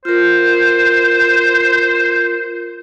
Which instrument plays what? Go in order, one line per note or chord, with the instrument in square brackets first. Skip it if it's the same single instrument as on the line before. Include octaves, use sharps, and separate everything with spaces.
[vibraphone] F4 A#4 [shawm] C5